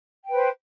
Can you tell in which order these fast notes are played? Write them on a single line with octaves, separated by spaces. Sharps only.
G5 B4 C5